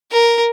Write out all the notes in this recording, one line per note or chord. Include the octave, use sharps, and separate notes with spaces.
A#4